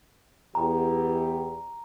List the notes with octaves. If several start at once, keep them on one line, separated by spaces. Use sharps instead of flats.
E2 G4 A#5